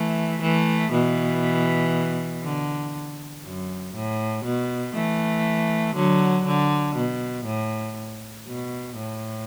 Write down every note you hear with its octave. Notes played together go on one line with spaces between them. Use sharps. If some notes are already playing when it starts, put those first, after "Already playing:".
Already playing: E3 A3
E3 A3
B2 E3
D3
F#2
A2
B2
E3 A3
D3 F#3
D3
B2
A2
B2
A2